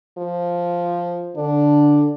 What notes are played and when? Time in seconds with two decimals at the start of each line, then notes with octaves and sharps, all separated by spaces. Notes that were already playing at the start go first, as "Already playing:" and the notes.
0.18 F3
1.37 D3 D4